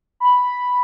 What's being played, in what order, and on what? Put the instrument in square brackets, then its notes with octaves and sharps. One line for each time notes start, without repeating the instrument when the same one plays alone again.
[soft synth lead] B5